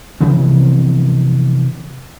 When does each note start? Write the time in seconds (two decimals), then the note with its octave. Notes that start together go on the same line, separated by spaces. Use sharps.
0.21 C3 E3 F3 B3